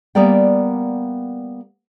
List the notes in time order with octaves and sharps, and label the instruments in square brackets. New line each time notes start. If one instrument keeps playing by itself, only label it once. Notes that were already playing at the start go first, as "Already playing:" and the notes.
[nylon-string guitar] G3 A#3 B3 A#4 D5 G5